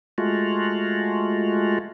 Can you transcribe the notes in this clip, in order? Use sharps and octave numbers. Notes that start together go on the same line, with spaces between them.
G#3 A3 F4 F#4